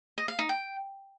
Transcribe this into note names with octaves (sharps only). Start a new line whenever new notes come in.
D#5
F5
D#4
G5